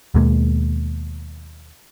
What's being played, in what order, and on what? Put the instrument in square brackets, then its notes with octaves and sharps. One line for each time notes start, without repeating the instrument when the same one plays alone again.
[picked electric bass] D#2 B2 G#3 A#3